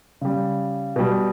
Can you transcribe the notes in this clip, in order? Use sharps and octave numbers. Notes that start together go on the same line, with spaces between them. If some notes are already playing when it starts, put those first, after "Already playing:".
C#3 G3
B2 G3